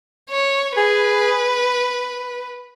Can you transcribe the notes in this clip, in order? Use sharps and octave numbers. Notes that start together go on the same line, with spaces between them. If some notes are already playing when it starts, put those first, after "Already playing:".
C#5
G#4 B4